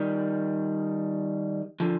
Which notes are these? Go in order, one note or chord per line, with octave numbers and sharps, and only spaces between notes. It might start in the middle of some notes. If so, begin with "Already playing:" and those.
Already playing: D#3 G3
D3 F3